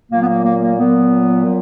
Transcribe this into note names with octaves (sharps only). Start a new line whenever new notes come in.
A#2 F#3 A#3
B3
A#3
A#3
A#3
A#2 F#3 B3
A#2 F#3